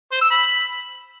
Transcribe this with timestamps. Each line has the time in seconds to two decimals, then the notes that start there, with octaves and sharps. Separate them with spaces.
0.12 C5
0.21 E6
0.31 B5